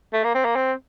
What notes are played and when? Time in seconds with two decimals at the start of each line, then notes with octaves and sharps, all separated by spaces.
0.13 A3
0.24 A#3
0.35 C4
0.45 A#3
0.56 C4